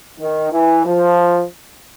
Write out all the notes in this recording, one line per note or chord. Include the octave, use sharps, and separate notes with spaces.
D#3
E3
F3